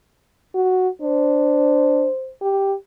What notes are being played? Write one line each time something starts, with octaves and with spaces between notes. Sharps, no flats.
F#4
D4 C5
G4